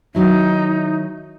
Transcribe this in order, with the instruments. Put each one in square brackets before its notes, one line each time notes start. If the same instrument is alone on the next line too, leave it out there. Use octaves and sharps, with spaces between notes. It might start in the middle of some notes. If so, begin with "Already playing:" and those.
[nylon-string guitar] D#3 F#3 E4 [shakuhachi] D#4